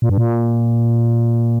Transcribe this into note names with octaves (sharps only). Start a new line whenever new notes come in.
A#2
G2
A#2